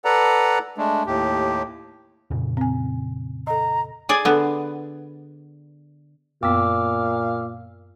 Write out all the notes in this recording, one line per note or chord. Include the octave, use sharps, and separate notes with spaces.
A4 B4 D5 F#5 A#5
G#3 A3 D4
D#2 A2 G4
F2 A#2 C#3
C4 G#5
A4 D#5 A#5
G#4 D5 G#5
D3 B3
F#2 A#2 B3 F5 D6 E6